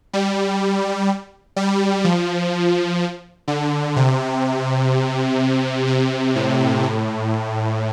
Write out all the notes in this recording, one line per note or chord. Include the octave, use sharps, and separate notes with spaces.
G3
G3
F3
D3
C3
C3
A2
A2